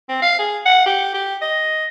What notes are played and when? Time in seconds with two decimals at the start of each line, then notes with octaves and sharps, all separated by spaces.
0.09 C4
0.22 F5
0.39 G#4
0.66 F#5
0.86 G4
1.14 G4
1.41 D#5